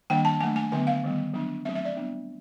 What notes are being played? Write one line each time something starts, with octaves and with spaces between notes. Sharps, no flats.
D#3 G3 A#3 D4 G5
A5
F#3 A3 D4 G#5
G#5
D3 F#3 B3 G#5
F5
D#3 G3 B3
F#3 B3 D4
F#3 A3 C4 E5
E5
D5
G3 B3 D4